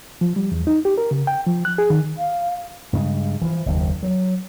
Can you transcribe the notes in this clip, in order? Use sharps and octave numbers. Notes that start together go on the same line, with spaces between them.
F3
G3
E2
D#4
G4
A#4
C#3
G5
F3
F#6
G#4
D#3
F5
G2 C#3 G#3
E3 F3
F#1 D#2
F#3